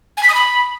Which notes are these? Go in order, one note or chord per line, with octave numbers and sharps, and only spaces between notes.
G#5
B6
D#6
B5